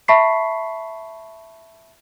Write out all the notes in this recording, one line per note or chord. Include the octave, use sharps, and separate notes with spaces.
E5 A5 B5 C#6 B6 C7